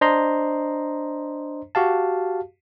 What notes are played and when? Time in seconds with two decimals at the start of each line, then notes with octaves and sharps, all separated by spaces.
0.01 D4 C5 D#5 A#5 C6
1.75 F#4 G4 F5 A5